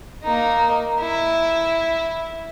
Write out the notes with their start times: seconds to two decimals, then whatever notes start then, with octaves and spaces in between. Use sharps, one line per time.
0.24 A#3 D#4
1.01 E4